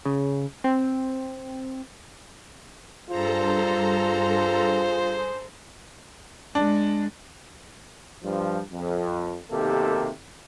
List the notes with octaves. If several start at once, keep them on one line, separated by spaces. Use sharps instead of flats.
C#3
C4
G2 F4 G#4 A4 C5 A#5
G#3 D4
G2 F3
F2
B1 C3 D#3 A#3 G4 A4